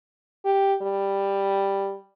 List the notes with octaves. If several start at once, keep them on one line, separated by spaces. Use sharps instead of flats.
G4
G3